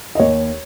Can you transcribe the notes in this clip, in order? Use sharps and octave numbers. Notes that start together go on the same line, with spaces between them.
D#5
D#2 C#5